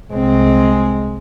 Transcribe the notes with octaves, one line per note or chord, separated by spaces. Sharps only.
C2 G#3 C4